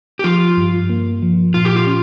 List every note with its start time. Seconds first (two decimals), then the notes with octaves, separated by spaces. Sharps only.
0.19 G4
0.24 F3 F4
0.57 G2
0.90 A#3
1.22 F3
1.54 A#2 F4
1.65 G4
1.76 F4
1.87 C#4